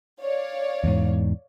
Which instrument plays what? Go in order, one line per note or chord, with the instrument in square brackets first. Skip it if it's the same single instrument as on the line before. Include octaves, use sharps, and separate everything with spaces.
[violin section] C#5 D5 F5
[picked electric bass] E2 G#2